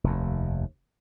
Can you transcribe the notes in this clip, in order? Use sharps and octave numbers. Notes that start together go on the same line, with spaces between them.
F1 D#2